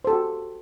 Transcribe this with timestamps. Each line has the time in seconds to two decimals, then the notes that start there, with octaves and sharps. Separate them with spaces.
0.05 C5
0.07 A4
0.10 G4
0.13 F#4